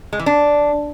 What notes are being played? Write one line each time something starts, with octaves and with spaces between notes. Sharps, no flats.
G#3
E3
D4